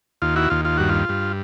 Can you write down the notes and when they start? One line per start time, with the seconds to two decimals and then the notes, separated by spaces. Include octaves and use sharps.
0.22 D#2 F4
0.36 E4 F#4
0.50 D#2 F4
0.65 F4
0.77 G2 F#4
0.89 F4
1.09 G2